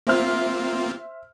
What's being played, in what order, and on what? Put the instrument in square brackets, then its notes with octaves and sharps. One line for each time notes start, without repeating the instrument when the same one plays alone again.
[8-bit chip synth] A#3 C4 F4 [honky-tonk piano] C5 E5 F6